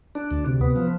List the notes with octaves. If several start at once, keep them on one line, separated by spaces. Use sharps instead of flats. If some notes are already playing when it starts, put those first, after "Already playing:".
D4
D2
C3
B3
F3